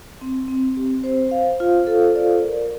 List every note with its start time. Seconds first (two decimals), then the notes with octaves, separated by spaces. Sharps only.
0.21 C4
0.48 C4
0.77 G4
1.04 C5
1.31 F5
1.60 F4
1.87 A4
2.16 D5
2.43 A#4